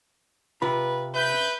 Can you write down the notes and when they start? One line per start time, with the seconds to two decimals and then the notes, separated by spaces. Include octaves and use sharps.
0.62 C3 F4 B4 B5
1.15 B4 E5 G6